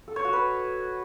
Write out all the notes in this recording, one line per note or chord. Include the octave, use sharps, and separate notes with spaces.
A4
C#5
F#4
B4